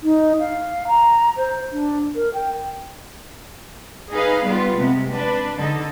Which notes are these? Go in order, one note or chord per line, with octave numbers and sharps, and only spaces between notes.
D#4
F5
A#5
C5
D4
A#4
G5
D#4 G#4 B4 D#5 F5
G3 B3 F4 B4
C3 G#3 B3
D4 B4
D3 D#4 A4 D#5